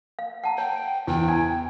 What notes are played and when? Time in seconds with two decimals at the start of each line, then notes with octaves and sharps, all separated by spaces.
0.19 F5
0.44 F#5 A5 A#5
0.58 C#5 G5
1.07 E2 G5
1.28 G#5